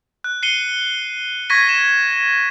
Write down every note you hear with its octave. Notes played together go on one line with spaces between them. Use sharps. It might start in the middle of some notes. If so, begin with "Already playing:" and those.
F#6
C7 C#7 D#7 G7
C#6 G#6 A#6 B6 D#7
E7